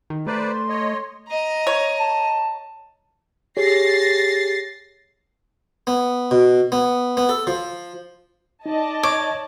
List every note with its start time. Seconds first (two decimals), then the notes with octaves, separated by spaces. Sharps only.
0.10 D#3
0.27 A3 B4 C5 D5 A#5
0.49 C6
0.68 C#5 D#5
1.28 D#5 A#5
1.67 C#5
2.00 A5
3.57 G4 G#4 C#5 A6 A#6 C7
5.87 B3
6.31 B2
6.72 B3
7.17 B3
7.29 A4
7.47 F3
8.66 D#4 D5 D#5 A5
9.03 C#5 D6